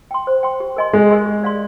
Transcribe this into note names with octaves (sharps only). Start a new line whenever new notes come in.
G5 C6
C5
G5 C6
G4
A#4 D#5 G#5 C6
G#3 G4
A#4 D#5 G#5 C6
G4
D5 F5 C6